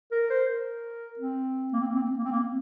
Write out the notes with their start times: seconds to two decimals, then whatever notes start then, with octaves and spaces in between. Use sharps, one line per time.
0.12 A#4
0.30 C5
0.48 A#4
1.19 C4
1.73 A#3
1.80 C4
1.88 A#3
1.95 C4
2.03 A#3
2.09 C4
2.17 A#3
2.24 C4
2.32 A#3
2.40 C4